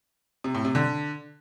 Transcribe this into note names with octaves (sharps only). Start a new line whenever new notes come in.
C3
A2
C3
D3